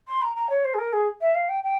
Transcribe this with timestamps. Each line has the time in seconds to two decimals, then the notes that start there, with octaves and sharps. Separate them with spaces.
0.08 C6
0.22 A#5
0.36 A#5
0.50 C#5
0.65 C5
0.74 G#4
0.79 A#4
0.93 G#4
1.21 E5
1.35 F5
1.49 G5
1.64 G5